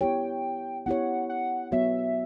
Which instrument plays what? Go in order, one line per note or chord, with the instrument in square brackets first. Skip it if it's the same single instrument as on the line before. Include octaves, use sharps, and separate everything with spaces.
[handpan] B3 E4 G4 C#5 [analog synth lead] G5
[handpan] B3 E4 G4 C#5 [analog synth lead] F#5
[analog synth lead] F#5
[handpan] F#3 B3 F#4 C#5 [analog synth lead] E5